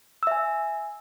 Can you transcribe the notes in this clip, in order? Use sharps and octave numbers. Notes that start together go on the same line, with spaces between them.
E5 G#5 E6